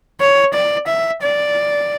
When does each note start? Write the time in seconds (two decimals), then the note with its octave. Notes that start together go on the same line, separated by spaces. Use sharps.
0.21 C#5
0.54 D5
0.87 E5
1.22 D5